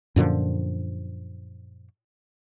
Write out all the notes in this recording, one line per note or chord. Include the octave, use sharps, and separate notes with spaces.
F#2 A#2 D3 F3